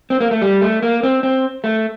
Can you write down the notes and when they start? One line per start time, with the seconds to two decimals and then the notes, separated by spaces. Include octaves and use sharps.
0.10 C4
0.20 A#3
0.31 A3
0.42 G3
0.61 A3
0.82 A#3
1.03 C4
1.23 C4
1.64 A3